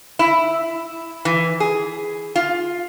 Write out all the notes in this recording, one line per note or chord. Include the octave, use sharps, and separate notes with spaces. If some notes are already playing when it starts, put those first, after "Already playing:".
E4
E3
G#4
F4